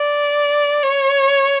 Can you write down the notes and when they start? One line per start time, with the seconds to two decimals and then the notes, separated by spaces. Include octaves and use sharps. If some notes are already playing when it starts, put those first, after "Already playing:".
Already playing: D5
0.83 C#5